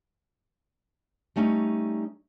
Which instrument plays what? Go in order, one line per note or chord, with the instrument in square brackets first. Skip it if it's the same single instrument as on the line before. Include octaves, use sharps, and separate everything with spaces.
[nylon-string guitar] G3 A3 C#4 D#4